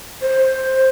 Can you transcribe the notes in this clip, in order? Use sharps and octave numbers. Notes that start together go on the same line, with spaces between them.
C5